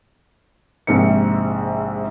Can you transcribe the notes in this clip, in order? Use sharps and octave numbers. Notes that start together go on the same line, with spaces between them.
A#1 G#2 C3 C#7